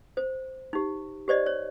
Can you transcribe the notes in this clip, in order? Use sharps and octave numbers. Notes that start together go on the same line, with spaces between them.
C5
D#4 G4
G4 C5 D5 D#5
C#5